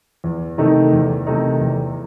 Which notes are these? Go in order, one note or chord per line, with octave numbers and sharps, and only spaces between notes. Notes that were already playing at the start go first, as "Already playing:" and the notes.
E2
C3 D#3 A3 D#4
E2
C3 D#3 A3 D#4
E2